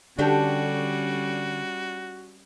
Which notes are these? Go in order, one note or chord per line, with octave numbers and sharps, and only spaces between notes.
D3 G3 C#4 D4 F#4 G4 A4